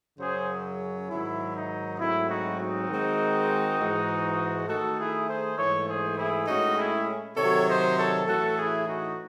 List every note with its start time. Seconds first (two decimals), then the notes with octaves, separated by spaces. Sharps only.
0.19 F#2 C#3 F#3 C#4 G#4 C5
1.09 G#2 D#3 F#3 E4
1.54 D#4
1.99 G#2 F#3 A3 C4 E4
2.28 D#4 F#4
2.58 D#4 F#4
2.88 D#3 G#3 C4
3.79 G#2 E3 G#3
4.67 D#3 A3 D#4 F#4 A4
4.98 E4 G#4
5.28 G#4 C5
5.57 G#2 E3 A3 A4 C#5
5.87 G#4 C5
6.17 E4 G#4
6.47 A2 G#3 C#4 D#4 F#4
6.76 E4 G#4
7.37 C3 D#3 F#3 A4 C#5
7.66 C5 D#5
7.96 A4 C#5
8.26 A2 E3 A3 F#4 A4
8.56 E4 G#4
8.86 D#4 F#4